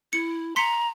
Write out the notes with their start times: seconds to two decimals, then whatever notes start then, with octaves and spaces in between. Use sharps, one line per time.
0.13 E4 C#7
0.56 A#5 C6 B6 C#7